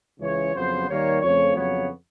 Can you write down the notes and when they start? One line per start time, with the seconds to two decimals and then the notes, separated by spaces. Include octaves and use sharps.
0.20 C#2 C#3 E3 G#3 C#5
0.54 F2 C#3 F#3 B3 C5
0.89 D#2 D#3 G3 A#3 C#5
1.22 F2 C#3 F3 A3 C#5
1.56 F2 C#3 F#3 B3 C#5